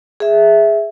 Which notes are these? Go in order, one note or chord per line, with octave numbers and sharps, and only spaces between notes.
G#4 E5